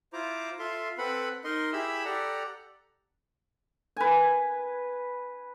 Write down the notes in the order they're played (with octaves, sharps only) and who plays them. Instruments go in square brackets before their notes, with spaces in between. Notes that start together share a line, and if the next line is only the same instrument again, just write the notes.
[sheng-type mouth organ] E4 F4 C5 A#5 D6
F4 A4 E5 F5 C6
C4 A4 B4 F#5 B5
D#4 A#4 D#5 C6
E4 G4 G#4 E5 B5 E6
G4 A4 D5 F#5 A#5
[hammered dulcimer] B4 G#5